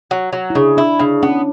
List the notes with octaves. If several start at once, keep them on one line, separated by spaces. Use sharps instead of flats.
F#3
F#3
E4
C#3 D4
D4 E4
C#3 D4
B3 C#4